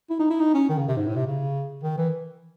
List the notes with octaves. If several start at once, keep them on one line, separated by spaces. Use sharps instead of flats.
E4
D#4
E4
D#4
C#4
D#3
C#3
C3
G#2
A2
C3
C#3
D#3
E3